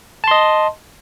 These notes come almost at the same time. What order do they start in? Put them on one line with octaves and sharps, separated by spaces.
A5 C6 D#5